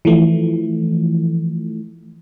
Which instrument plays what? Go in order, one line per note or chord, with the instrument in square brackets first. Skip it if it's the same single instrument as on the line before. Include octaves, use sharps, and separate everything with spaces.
[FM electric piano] E3 F3 A3